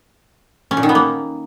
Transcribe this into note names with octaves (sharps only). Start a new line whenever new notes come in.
C#4
A#2
D#3
B3
A#3